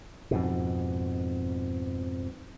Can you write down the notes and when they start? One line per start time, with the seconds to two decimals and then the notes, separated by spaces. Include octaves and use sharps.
0.31 F2 G#2 B2